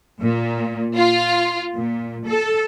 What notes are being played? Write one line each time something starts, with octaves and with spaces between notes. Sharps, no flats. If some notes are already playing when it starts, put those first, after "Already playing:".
A#2
F4
A#2
A4